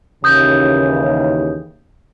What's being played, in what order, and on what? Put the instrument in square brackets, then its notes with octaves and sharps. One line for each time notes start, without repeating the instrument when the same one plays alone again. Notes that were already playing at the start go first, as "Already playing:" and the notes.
[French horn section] D#2 C#3 E3 [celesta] D#6 G6